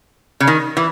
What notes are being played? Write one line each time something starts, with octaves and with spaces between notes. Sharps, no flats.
C#3
D#3
E3